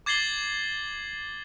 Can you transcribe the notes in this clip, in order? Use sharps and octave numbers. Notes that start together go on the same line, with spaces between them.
D6 G#6 A6 C7 F#7 G7